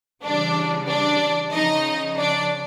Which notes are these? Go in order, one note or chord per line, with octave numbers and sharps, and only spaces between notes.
C#3 E3 G3 D4 D5
D4 D5
C#3 F3 D#4 D#5
D4 D5